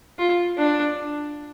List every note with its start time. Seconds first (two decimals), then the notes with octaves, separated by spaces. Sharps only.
0.19 F4
0.58 D4